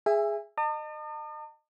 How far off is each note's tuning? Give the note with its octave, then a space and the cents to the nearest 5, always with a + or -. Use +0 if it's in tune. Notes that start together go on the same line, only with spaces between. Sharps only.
G#4 +0 E5 +15 G#5 -30
D#5 -30 A5 +45 D#6 -40